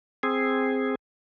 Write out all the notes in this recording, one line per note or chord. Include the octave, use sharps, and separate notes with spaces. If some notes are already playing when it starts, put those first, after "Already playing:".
C4 G#4